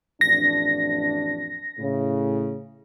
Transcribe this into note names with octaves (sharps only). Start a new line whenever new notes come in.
A1 F2 D4 A#6
A2 C#3